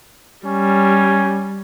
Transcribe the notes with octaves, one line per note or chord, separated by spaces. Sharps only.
G3 C#4